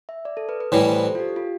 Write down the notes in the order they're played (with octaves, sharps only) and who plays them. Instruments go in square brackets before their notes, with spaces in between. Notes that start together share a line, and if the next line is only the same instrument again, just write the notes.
[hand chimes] E5
D5
A4
B4
B4
[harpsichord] A2 E3 G3 [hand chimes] A4
[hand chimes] C5
A4
F4
G4
F4